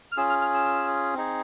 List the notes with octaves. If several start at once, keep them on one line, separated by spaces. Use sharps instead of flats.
F6
C#4 F4 G#4 E6
F6
F6
E6
C4 D#4 G#4